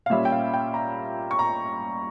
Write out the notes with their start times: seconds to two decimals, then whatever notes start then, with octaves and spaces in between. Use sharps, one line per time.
0.06 F5
0.10 A#2 G3 C#4 E5
0.25 G5
0.32 F5
0.53 G5
0.74 A#5
1.31 C#6
1.39 A#5